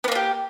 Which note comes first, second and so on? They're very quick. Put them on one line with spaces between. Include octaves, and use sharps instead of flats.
B3 A#3 D4 G4